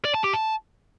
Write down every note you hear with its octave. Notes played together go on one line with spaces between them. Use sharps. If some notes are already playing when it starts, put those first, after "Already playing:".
D5
A5
G4
A5